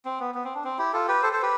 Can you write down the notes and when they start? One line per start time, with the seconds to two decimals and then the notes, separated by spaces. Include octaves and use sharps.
0.05 C4
0.20 B3
0.35 B3
0.45 C4
0.55 D4
0.64 C4
0.78 E4 G4
0.93 F4 A4
1.08 G4 B4
1.22 A4 C5
1.33 A4 C5
1.42 G4 B4